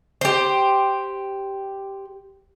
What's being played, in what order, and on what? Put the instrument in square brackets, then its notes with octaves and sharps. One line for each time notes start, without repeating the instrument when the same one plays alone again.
[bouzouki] G4 C5